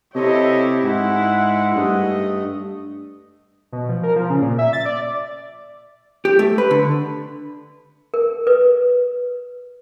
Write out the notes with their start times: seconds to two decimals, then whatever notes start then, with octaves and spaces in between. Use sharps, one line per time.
0.15 C3 E4 G4 A4 C#5 D#5
0.83 G#2 G#3 E4 F#5
1.75 G2 A3 D#5
3.72 B2
3.89 F3
4.03 A#4
4.16 F3
4.30 C#3
4.42 A#2
4.59 E5
4.73 A6
4.85 D5
6.25 G4
6.39 A3
6.58 B4
6.71 D3
8.14 A#4
8.47 B4